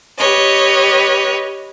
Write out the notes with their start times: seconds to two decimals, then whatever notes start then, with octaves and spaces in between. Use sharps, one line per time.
0.18 G4 B4 C#5 D#5